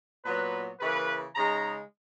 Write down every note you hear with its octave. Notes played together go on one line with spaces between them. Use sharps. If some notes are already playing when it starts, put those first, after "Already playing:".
A#2 F#3 B3 B4
C#3 E3 A#3 B4
C#3 G#3 D#4 A#5